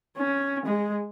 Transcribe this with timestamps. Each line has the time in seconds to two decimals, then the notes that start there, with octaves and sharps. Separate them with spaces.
0.18 C#4
0.65 G#3